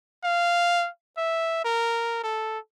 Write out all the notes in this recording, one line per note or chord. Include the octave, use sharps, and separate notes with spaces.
F5
E5
A#4
A4